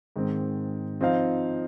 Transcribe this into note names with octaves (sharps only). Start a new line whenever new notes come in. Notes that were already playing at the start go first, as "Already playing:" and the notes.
G#2 D#3 C4
F3 C4 D#4 C5 F5